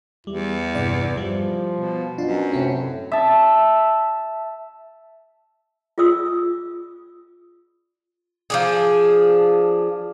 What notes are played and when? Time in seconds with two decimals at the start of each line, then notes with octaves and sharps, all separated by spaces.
0.27 E2 G3 E4
0.75 G2 C3 D5
1.17 F3 G3
1.74 B2
2.18 F#2 B2 D4 F4
2.52 A2 C3 C4 C#4
3.12 E5 A5
5.98 F4 G#4 D5 D#6 E6
8.50 F3 D4 G#4